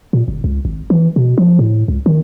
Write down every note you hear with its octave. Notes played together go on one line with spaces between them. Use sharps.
A#2
G1
C#2
G#1
E3
B2
F3
A2
C#2
D#3